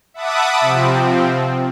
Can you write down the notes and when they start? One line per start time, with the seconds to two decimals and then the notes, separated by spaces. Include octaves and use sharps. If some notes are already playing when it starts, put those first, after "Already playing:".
0.14 E5 F#5 A5 B5 D6 D#6
0.61 C3 F3 C4